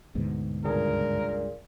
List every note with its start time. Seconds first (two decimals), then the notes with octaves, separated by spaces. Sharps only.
0.15 D2 G#2 B2
0.64 C#2 G2 A#2 G#4 A#4